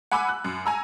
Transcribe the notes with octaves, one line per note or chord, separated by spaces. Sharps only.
F#5 G#5 B5 D6 E6
F#6
F#2
G#5 A#5 E6